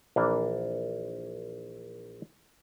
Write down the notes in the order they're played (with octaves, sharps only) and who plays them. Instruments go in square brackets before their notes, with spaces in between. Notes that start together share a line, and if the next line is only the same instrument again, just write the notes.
[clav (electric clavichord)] A#1 E3 A#3 D4